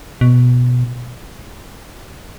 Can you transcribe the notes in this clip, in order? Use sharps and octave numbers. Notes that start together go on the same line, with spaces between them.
B2